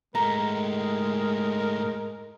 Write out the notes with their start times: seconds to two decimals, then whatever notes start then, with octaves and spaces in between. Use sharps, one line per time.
0.15 G#2 G#3 A3 A#4 A#5